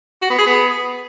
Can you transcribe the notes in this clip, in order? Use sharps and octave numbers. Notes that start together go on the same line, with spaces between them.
F#4
B3
G#4
B3